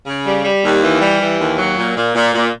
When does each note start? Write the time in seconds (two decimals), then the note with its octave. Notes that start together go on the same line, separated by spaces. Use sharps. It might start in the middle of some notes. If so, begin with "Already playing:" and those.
0.06 C#3
0.25 G3
0.45 G3
0.64 D#2
0.82 E3
1.02 G3
1.20 E3
1.40 D#2
1.58 F#3
1.78 A#2
1.97 A#2
2.16 A#2
2.34 A#2